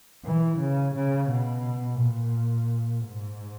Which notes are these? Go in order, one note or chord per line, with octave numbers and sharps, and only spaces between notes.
E3
C#3
C#3
B2
A#2
G#2